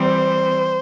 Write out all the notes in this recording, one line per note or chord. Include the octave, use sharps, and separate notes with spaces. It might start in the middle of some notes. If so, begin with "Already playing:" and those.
Already playing: E3 G3 C4 C5